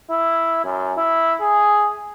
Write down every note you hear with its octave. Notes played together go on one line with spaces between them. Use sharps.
E4
F#2
E4
G#4